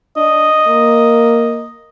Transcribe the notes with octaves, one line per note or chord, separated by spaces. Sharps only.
D4 D#5
A#3